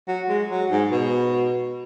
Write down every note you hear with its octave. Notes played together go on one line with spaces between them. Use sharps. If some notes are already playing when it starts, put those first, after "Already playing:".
F#3
G#3
F#3
G#2
B2